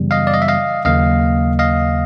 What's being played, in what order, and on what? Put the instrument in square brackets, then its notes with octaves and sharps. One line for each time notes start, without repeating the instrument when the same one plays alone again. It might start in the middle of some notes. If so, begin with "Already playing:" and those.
Already playing: [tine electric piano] F#2 C#3 E3 G3 B3
D#5 F5
D5
D#5
E5
D#5 F5
D#2 C#3 F#3 A#3 D#5 F5
D#5 F5